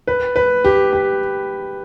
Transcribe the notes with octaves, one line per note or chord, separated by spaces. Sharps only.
B4
B4
G4
G4